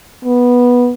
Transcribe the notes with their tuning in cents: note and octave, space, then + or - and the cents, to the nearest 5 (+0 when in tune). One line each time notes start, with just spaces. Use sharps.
B3 -10